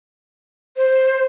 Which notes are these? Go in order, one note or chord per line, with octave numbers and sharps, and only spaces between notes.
C5